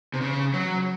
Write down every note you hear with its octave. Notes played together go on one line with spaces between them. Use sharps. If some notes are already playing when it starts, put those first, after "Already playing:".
C3
C#3
F#3